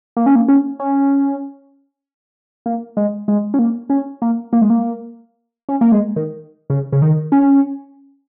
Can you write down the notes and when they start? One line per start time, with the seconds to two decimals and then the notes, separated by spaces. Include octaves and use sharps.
0.17 A#3
0.26 C#4
0.35 A#3
0.48 C#4
0.80 C#4
2.66 A#3
2.97 G#3
3.28 G#3
3.54 C#4
3.59 A#3
3.90 C#4
4.22 A#3
4.53 A#3
4.62 G#3
4.70 A#3
5.69 C#4
5.81 A#3
5.92 G#3
6.16 D#3
6.70 C#3
6.92 C#3
7.02 D#3
7.32 C#4